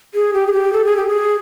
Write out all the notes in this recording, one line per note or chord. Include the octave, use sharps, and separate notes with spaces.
G#4
G4
G#4
G4
A4
G#4
G4
G#4